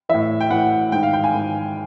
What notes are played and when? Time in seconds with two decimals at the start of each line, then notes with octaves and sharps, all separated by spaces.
0.09 A2 E3 E5
0.41 G5
0.51 A2 E3 F#5
0.92 G#2 D#3 G5
1.03 F5
1.13 G5
1.24 G#5
1.34 G#2 D#3